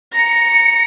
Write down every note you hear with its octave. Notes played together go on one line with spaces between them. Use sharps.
A#5 A#6 C#7